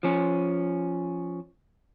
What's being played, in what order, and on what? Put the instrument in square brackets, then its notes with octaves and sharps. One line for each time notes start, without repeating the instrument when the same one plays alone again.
[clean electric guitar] F3 C#4